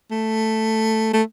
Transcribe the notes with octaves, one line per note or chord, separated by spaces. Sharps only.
A3
A3